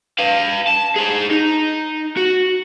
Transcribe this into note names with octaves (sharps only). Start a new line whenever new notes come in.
B4 F5
A5
G#4 C5
D#4
F#4